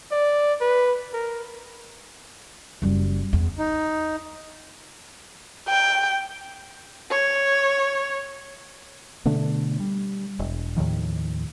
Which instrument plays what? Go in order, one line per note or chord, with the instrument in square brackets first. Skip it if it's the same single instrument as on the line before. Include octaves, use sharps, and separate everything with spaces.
[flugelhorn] D5
B4
A#4
[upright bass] F#1 G3
E2
[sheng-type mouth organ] D#4
[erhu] G5
[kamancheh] C#5
[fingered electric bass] B2 D3 A3 D4
G3
E1
D#2 A2 D#3 F3